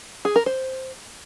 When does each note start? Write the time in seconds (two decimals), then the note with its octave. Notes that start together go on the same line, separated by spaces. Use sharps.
0.25 G#4
0.36 A#4
0.46 C5